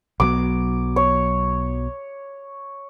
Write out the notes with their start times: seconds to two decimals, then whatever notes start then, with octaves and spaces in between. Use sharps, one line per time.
0.20 B1 F#3 B3 D6
0.96 C#5